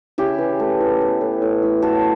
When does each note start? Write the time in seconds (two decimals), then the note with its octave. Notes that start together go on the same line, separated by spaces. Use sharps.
0.18 C#3 E4 G4
0.38 E3
0.60 A3
0.80 E3
1.01 B3
1.21 A2
1.42 A2
1.63 A2
1.82 F#3 F#4 A4